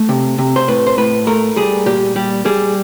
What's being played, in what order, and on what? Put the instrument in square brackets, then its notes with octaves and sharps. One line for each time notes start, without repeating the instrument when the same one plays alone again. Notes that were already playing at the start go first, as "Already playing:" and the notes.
Already playing: [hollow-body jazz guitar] A3
C3
C3
C5
A2 B4
C5
A2 B4
A3 A#4
G3 G#4
A#2 G4
G3 G4
G3 G#4